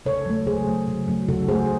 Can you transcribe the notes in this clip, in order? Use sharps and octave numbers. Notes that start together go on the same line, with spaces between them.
C#3 A4 C#5
F#3 A3
C#3 G#4 C5
F#3 A3
C#3
F#3 A3
C#3 F#4 A4
F#3 A3 G#4 C5